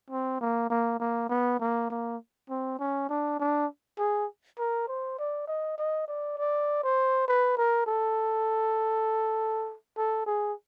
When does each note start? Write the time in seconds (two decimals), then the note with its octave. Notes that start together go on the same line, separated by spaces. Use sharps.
0.10 C4
0.41 A#3
0.70 A#3
0.99 A#3
1.29 B3
1.60 A#3
1.90 A#3
2.50 C4
2.79 C#4
3.09 D4
3.39 D4
3.98 G#4
4.58 A#4
4.88 C5
5.19 D5
5.48 D#5
5.78 D#5
6.07 D5
6.38 D5
6.83 C5
7.28 B4
7.57 A#4
7.87 A4
9.97 A4
10.26 G#4